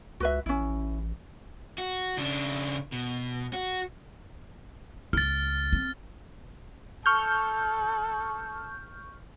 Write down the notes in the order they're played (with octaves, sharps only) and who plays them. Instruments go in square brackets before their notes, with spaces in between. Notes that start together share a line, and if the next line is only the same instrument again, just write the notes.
[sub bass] C#2 [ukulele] F#4 B4 E5
[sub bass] A1 [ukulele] C#4 E4
[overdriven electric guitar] F#4
C#3 D4
B2
F#4
[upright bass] C#2 [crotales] F6 A6
[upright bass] C4
[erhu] A4 [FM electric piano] C#6 F6 G6